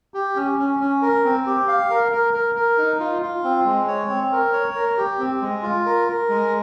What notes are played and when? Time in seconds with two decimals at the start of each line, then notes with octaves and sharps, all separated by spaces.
0.14 G4
0.36 C#4
0.58 C#4
0.80 C#4
1.02 A#4
1.24 C4
1.46 G4
1.68 F5
1.90 A#4
2.12 A#4
2.34 A#4
2.55 A#4
2.78 D#4
3.00 F4
3.22 F4
3.44 C4
3.65 G#3
3.88 C#5
4.09 C4
4.32 A#4
4.53 C#5
4.75 A#4
4.97 G4
5.19 C4
5.42 G#3
5.63 F4
5.86 A#4
6.08 A#4
6.29 G#3